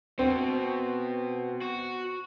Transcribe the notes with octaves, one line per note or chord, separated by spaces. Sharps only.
B2 C4
F#4